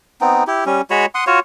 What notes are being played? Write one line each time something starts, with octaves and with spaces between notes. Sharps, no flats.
B3 C4 D#4
E4 G4
G3 C#4
G#3 F#4 C#5 B5
F#5 C6 D#6
F4 F#4 C#5